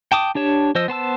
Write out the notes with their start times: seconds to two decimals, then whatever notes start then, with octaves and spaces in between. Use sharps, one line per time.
0.12 G5 A5 D6 D#6
0.35 D4 G4 C#5 A5
0.75 F3 C5 D#5 E6
0.88 B3 C5 A5 E6